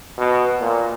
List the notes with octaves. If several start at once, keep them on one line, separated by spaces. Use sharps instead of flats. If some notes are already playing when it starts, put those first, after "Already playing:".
B2
A#2